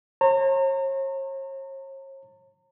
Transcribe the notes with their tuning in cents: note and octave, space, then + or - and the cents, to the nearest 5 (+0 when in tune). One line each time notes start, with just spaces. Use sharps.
C#5 -40 A#5 -35